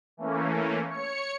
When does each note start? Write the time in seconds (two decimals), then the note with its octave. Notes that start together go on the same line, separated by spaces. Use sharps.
0.17 E3 A3 A#3 C#4
0.86 C#5 C#7